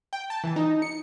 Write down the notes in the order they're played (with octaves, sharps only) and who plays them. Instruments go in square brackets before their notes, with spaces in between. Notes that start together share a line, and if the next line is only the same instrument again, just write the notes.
[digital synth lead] G5
A5
E3
D#4
C#7